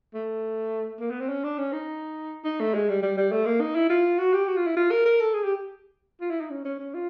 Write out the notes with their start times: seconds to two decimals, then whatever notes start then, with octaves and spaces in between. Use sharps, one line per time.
0.14 A3
1.00 A#3
1.10 B3
1.20 C4
1.29 C#4
1.44 D4
1.58 C#4
1.73 D#4
2.44 D#4
2.60 A3
2.74 G#3
2.89 G3
3.02 G3
3.17 G3
3.32 A3
3.46 A#3
3.61 D#4
3.75 E4
3.89 F4
4.19 F#4
4.33 G4
4.47 F#4
4.57 F4
4.67 E4
4.76 F4
4.91 A#4
5.05 A#4
5.20 A4
5.34 G#4
5.44 G4
6.21 F4
6.30 E4
6.40 D#4
6.50 C#4
6.65 C#4
6.79 C#4
6.94 F4